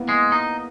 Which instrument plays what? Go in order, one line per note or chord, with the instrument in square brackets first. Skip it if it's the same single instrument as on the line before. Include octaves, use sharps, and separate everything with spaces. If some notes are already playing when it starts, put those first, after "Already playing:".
Already playing: [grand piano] A#3 B3 E4
[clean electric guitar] G#3
D#4